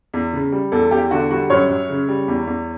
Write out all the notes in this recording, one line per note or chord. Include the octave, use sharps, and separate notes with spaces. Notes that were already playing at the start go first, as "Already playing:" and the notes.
E2
C#3
G3
E2 A4
E2 G4
D3 F#4
G3 F#4
F#2 C#5
F#2
C#3
G3
E2
E2